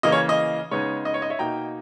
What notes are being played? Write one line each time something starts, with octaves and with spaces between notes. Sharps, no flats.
C#3 E3 A#3 C#4 D#5
C#5
D#5
C#3 G#3 B3 D#4 C#5
D#5
C#5
D#5
C#5 E5
B2 A#3 D#4 G5 A#5